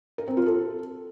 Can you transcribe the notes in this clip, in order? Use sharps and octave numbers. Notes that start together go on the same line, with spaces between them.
A#4
C4
F4
A4